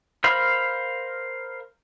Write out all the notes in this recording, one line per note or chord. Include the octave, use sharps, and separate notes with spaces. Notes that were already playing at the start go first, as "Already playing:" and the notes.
A#4 C5 F5 B5